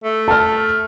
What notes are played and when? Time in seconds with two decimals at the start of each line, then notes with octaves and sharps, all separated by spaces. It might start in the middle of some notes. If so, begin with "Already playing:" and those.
0.04 A3
0.28 A5 F6